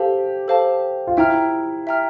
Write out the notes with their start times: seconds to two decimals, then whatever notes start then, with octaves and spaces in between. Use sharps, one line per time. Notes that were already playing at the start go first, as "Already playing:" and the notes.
Already playing: G4 A4 C5 F5 A5
0.48 A4 C5 F5 A5
1.07 F4
1.17 E4 E5 G5 A#5 F6
1.87 E5 G5 A#5 F6